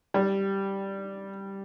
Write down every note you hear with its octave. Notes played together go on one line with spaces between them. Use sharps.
G3